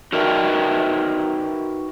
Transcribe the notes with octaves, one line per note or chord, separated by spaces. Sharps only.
D#4 F#4 A#4 B4 E5 G5